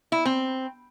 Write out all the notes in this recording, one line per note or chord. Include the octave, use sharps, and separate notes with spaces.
E4
C4